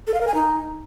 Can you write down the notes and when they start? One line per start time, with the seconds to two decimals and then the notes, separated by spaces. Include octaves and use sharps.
0.07 A4
0.14 F5
0.21 A#4
0.27 G#5
0.34 D#4